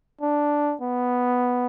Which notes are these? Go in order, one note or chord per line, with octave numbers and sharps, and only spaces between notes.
D4
B3